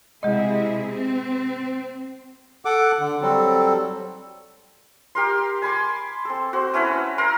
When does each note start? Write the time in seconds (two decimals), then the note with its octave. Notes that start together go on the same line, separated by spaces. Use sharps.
0.23 C3 G#3 E4 G#4 D#5
0.86 C4
2.65 A4 F#5 D6
2.99 D3
3.22 F#3 G3 C4 A4
5.15 G4 A#4 C6
5.62 G#5 B5 C6 D6
6.25 C4 A4
6.53 F#4 C5
6.74 A3 C#4 E4 B4
7.18 A#4 A#5 C6